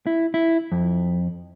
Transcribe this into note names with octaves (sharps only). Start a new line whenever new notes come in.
E4
E4
F2